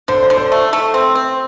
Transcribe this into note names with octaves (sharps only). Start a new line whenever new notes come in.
D3 C5
C5
D3
C5
A3
A3
C4
C4